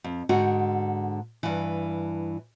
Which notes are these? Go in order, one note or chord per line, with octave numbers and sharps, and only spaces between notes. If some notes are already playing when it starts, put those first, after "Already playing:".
F2
G#2 D3 F#4
G2 E3